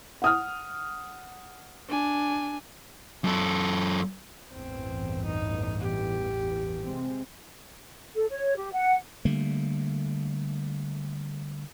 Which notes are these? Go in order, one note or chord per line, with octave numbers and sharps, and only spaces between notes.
F#5 D#6 F6
D4 G#5
F#2 A4
A1 E2 G2 C4
D#4
G4
C3 G#3 C4
A4
C#5
G4
F#5
D3 G3 A3 A#3